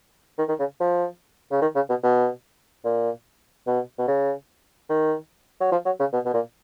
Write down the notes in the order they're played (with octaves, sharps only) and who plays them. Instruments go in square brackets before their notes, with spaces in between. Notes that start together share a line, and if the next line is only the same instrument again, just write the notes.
[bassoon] D#3
D#3
C#3
F3
C#3
D#3
C#3
B2
B2
A#2
B2
B2
C#3
D#3
F#3
F3
F#3
C#3
B2
B2
A#2